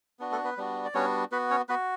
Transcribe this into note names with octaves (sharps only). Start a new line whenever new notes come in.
B3 D4 F#4
A3 A4
B3 B4
G3 B3 D4 F#4
D5
G3 B3 C#4 D4 F#4 C#5
B3 F#4 B4
C#4 C#5
B3 F#4 B4